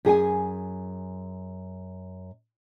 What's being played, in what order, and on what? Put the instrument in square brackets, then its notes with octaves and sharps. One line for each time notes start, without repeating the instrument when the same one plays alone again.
[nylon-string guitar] F#2 G#4 G5 G#5